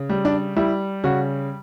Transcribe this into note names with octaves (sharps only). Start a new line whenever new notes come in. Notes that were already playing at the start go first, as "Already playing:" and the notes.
Already playing: C#3
G3
D4
G3 E4
C#3 F#4